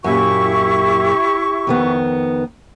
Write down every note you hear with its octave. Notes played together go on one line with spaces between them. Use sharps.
F#2 A#2 E4 G4 C#6
F2 D#3 B3